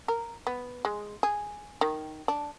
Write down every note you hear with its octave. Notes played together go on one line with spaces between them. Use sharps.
A#4
B3
G#3
G#4
D#3
D4